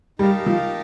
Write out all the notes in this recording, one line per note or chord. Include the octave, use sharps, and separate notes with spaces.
G3 D#4 G4 A#4 F5 A5
F3